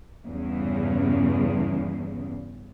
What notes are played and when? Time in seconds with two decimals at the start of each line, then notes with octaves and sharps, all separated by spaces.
0.25 E2 G2 C#3